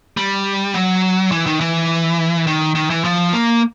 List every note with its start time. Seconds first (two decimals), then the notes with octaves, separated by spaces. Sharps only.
0.17 G3
0.74 F#3
1.32 E3
1.46 D#3
1.61 E3
2.47 D#3
2.75 D#3
2.90 E3
3.04 F3
3.33 A#3